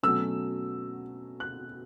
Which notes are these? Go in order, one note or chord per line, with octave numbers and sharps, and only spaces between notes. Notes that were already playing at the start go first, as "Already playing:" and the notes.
B2 F#3 A3 C#4 E6
F#6